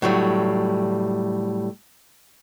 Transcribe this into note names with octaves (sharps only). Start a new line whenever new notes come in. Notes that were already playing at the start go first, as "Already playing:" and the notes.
A2 F#3 G3